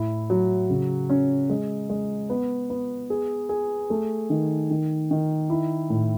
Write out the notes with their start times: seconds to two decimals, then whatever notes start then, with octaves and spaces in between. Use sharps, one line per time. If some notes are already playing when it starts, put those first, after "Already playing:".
Already playing: A2 E4
0.30 F#3
0.70 C#3
1.09 C#4
1.50 G#3
1.90 G#3
2.30 B3
2.70 B3
3.10 G#4
3.49 G#4
3.90 A3
4.30 D#3
4.70 D#3
5.11 D#3
5.50 E4
5.90 A2